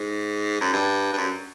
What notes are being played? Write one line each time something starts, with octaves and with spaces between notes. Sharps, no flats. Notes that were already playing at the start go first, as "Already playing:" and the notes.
Already playing: G#2
F#2
G2
G2
F#2